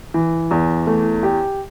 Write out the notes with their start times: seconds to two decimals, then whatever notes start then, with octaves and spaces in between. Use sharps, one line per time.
0.14 E3
0.51 E2
0.87 A3
1.23 G4